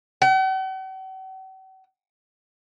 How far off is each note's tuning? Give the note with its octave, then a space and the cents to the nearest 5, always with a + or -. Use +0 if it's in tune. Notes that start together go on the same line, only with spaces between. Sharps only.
F#5 +45